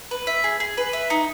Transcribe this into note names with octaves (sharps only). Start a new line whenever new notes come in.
B4
E5
G#4
G#4
B4
E5
D#4